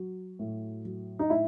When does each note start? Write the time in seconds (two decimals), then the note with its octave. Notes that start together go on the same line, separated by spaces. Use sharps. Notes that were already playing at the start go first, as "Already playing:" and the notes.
Already playing: F#3
0.39 A2
0.85 F#3
1.19 D#4
1.30 A2 E4